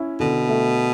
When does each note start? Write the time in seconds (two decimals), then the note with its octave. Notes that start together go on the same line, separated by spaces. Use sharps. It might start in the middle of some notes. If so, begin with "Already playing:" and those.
Already playing: C#4 E4
0.20 B2 D3
0.49 A3